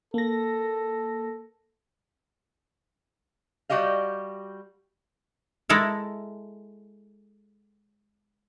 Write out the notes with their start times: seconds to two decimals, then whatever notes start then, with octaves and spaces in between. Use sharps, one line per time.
0.14 A#3 A4 A#6
3.69 G3 F#4 G4 D#5 F5
5.69 G#3 E4 A4 A#4